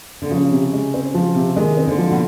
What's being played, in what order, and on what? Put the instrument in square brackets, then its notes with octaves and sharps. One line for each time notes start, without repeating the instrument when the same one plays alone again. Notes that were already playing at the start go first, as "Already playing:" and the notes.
[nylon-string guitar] D3
[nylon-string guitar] C#3 [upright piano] F3
[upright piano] C3
G#3
C4
F3
C3
[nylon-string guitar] D#3 [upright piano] G#3
[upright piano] C4
[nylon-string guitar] D3
[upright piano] F3
[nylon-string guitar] B2